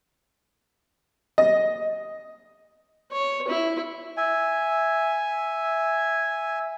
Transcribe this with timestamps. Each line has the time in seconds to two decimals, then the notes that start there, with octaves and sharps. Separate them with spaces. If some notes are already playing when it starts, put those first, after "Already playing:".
1.38 D#5
3.12 C#5
3.48 E4
4.17 E5 G#5